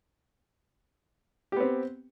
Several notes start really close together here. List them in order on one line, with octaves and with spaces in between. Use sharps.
G4 B3 C4